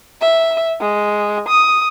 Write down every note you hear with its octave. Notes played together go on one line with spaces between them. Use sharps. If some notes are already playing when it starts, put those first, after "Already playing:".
E5
G#3
D#6